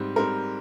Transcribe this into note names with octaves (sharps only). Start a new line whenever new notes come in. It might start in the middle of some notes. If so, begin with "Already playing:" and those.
Already playing: G#2 G3 C4
G#2 G3 C4 A#4